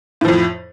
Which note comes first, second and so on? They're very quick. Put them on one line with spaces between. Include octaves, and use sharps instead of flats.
A2 F3 F2